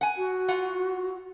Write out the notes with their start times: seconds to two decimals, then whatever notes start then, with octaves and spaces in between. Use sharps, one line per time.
0.01 F#5 G#5
0.17 F#4
0.48 F4 F#5